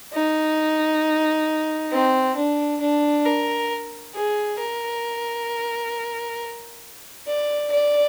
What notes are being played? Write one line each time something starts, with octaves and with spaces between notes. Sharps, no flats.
D#4
C4
D4
D4
A#4
G#4
A#4
D5
D5